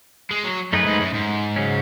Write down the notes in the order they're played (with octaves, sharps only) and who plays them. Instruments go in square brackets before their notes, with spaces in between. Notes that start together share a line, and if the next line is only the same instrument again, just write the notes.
[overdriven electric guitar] G#3
F#3
[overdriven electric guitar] F#2 [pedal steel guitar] A3 D#4 G#4 B4
[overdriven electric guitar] G#2
F#2
G#2
[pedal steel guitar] C#3 F#3 C#4